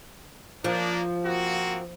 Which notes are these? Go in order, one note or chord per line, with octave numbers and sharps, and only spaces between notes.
F3 A#3 D4
A#3 C4 F#4